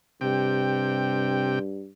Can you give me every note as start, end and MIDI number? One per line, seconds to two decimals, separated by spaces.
0.21 1.89 43
0.21 1.59 48
0.21 1.59 79